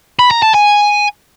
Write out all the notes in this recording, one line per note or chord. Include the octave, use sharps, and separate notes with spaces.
B5
A#5
A5
G#5